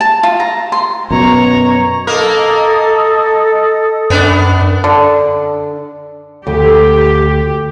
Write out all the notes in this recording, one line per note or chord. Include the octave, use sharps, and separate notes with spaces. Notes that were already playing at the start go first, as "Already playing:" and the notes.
A5
F4
A#5
C6
F#2 B2 C#5 A#5
A#3 A4 A#4 D#5 D#6
F#2 B3 D4
D3
D2 G4